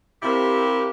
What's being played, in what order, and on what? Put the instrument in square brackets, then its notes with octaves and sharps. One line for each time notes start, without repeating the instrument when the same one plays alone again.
[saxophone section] C3 C4 E4 G4 A#4 F5